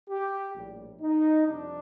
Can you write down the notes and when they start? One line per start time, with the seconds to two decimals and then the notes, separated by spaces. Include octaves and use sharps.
0.10 G4
0.55 A#1 A2 G3
1.01 D#4
1.47 F2 C3 G3 D4